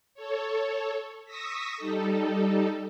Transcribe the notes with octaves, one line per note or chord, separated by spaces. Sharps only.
A4 C#5
C#6 D#6 E6 A#6 B6
G3 D#4 A4